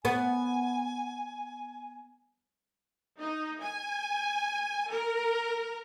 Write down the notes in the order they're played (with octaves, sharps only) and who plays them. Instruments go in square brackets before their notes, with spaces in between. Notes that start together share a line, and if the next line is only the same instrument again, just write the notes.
[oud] B3 [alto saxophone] G#5
[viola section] D#4
G#5
A#4